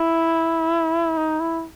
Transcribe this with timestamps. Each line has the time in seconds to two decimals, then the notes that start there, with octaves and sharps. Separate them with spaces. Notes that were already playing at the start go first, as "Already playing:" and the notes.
Already playing: E4
1.17 D#4
1.40 E4